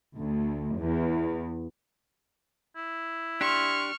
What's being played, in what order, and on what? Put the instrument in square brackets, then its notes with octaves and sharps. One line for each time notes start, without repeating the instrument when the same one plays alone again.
[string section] D2
E2
[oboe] E4
[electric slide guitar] D4 G4 [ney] C6 [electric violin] C#6 F6